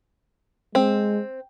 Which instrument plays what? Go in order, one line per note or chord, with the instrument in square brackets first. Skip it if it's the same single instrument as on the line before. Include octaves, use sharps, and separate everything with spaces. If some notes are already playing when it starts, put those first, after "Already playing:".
[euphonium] G#3 [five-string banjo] C4